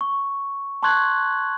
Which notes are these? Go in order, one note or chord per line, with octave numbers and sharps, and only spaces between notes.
C#6
A5 C6 C#6 F#6 G#6 F#7